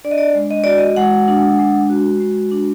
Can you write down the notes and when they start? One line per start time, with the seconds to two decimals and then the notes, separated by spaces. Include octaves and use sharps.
0.05 D4 D5
0.11 D#5
0.18 D5
0.35 G#3
0.50 D#5
0.64 F#4 D5
0.78 D#5
0.96 G#3 F#5
1.28 D4
1.59 G#3
1.90 F#4
2.20 G#3
2.51 D4